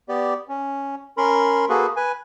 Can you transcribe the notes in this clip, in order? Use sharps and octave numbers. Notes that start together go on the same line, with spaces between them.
B3 G4 D5
C#4
C#4 A#4 B5 C6
A#3 F#4 G#4 A4 B4
B4 G#5